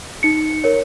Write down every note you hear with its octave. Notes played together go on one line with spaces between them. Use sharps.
D#4 C#7
A#4 C#5